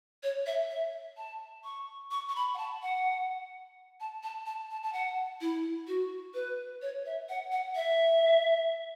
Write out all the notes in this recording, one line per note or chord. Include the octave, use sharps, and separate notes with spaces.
C#5
E5
E5
A5
C#6
C#6
C#6
B5
F#5
A5
F#5
A5
A5
A5
A5
A5
F#5
E4
F#4
B4
C#5
E5
F#5
F#5
E5